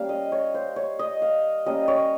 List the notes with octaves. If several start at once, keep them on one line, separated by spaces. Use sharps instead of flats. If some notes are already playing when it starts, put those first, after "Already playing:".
Already playing: G3 A#3 C#4 F5
D#5
C#5
C5
C#5
D#5
F5
G3 A#3 C#4 D#5
C#5